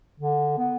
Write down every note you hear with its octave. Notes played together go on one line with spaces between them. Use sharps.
D3
B3